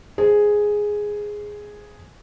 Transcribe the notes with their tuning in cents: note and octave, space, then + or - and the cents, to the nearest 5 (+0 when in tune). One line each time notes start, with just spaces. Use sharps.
G#4 +0 C5 +0